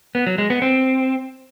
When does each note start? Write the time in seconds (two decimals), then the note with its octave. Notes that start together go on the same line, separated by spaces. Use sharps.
0.15 B3
0.27 F#3
0.38 G#3
0.50 B3
0.62 C4